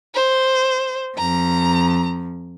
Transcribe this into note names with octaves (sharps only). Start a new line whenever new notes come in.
C5
F2 A#5